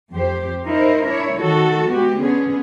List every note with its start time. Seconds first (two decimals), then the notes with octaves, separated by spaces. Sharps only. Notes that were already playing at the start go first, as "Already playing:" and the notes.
0.11 F2 G4 C5
0.65 D#4 E4 A#4 C5
1.07 D4 E4 C#5
1.40 D#3 F#4 A4
1.89 G#3 B3 F#4 G4
2.18 D3 B3 C#4 G#4